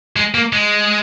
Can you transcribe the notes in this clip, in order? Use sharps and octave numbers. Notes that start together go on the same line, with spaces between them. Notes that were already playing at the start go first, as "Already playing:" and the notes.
G#3
A#3
G#3